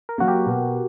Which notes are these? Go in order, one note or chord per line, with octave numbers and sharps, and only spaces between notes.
A#4
F#3 A#3 F#4
G4
B2